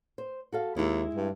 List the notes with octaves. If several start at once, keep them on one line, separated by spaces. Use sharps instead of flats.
C5
F#4 A4 F5
D#2 G#3 E4
G2